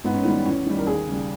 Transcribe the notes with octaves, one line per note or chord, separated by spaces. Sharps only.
G#2 B3
C#4
D#3 G3 B3
E2 C#4
D#3 G3
A#4
D#2 G#4
C#3 G3